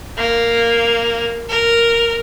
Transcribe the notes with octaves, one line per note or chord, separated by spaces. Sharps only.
A#3
A#4